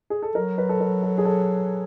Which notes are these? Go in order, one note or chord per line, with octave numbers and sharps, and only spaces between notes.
G#4
A4
F#3 A#4
B4
A4
A#4
A4
G#4
A4